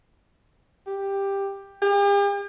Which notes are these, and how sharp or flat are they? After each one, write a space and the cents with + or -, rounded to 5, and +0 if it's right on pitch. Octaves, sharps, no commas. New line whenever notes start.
G4 +10
G4 +45